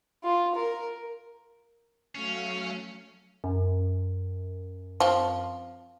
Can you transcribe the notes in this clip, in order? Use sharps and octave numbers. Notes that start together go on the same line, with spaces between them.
F4
A#4
F#3 A3 C#4 F5
F#2
F3 C4